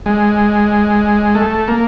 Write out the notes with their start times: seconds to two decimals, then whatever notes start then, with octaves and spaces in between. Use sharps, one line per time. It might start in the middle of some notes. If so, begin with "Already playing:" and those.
0.06 G#3
1.35 A3
1.68 A#3